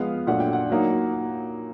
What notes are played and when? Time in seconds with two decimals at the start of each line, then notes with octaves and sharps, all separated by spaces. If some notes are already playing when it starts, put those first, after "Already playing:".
Already playing: F3 G#3 B3 F5
0.27 A#2 F#3 A3 D4 F4 F#5
0.40 G5
0.53 F#5
0.70 F#3 A#3 D#4